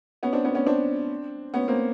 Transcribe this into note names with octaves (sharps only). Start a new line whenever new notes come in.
B3 C#4
C4 D4
B3 C#4
B3 C#4
C4 D4
B3 C#4
A#3 C4